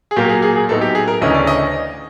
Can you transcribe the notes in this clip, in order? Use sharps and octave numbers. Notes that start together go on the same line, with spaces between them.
G#4
A#2 F#3 A#3 G4
G#4
G#4
G#4
A2 F#3 B3 D#4 A4
G4
G#4
A#4
D2 C#3 E3 A3 C#4 D#5
D5
D#5